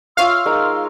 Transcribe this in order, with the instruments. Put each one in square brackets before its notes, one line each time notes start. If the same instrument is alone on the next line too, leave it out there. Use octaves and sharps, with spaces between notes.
[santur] F4 C#5 E5 [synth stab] F5 [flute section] C6 E6 F6
[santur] G#3 D#4 A#4